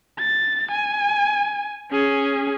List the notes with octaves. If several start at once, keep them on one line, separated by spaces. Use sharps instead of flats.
A6
G#5
C#4 G#4